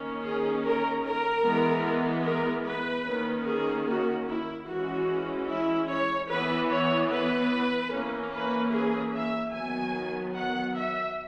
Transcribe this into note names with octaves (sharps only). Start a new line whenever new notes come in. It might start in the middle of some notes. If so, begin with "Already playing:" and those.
Already playing: D#3 A#3 C#4
G#4
A#4
A#4
E3 G#3 B3
A#4
B4
D#3 A#3 C#4
G#4
F#4
E4
E3 G#3 C#4 F#4
E4
C#5
E3 B3 B4
C#5
B4
E3 A#3 C#4
B4
G#4
E5
D#3 F#3 B3 G#5
F#5
E5